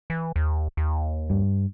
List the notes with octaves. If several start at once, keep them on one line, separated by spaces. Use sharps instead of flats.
E3
D#2
D#2
G2